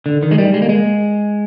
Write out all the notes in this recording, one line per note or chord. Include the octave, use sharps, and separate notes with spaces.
D3
D#3
G#3
G3
G#3
A#3
G#3